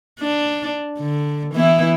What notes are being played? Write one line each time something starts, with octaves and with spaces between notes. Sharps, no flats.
D4
D3
E3 B3 E4